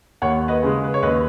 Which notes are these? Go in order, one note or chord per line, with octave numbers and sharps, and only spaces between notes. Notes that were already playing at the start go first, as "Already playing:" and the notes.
D#2 C#5 F#5
B4 D#5
C#3 G#3
B4
C#5
D#2 B4 D#5